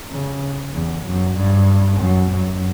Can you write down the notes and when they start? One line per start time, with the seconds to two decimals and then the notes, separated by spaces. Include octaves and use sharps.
0.12 C#3
0.74 E2
1.05 F#2
1.37 G2
2.00 F#2
2.31 F#2